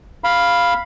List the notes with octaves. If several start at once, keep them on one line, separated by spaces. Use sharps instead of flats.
F5 B5